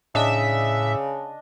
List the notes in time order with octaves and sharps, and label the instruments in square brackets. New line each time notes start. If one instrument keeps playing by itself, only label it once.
[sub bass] A2 [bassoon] C#3 [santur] D4 D#5 [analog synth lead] E5